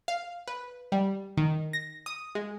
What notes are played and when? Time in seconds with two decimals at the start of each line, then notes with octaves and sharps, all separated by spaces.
0.08 F5
0.48 B4
0.92 G3
1.37 D#3
1.73 A#6
2.06 D#6
2.35 G#3